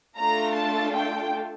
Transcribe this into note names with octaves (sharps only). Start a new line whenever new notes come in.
A3 D4 F4 A4 A#5
A5
G5